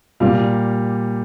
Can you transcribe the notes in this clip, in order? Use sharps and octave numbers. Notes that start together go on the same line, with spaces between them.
A#2 G3 A#3 F5